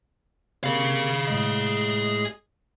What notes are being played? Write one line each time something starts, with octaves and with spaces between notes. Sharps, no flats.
C3 A#3 G#4 F5
A2 G#3 D#5